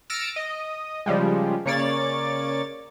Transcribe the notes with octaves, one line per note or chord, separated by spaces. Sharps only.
E6 F6 A6 A#6 C#7 D7
D#5
C#3 F3 G3 G#3
C#3 A#3 C#5 D5 A6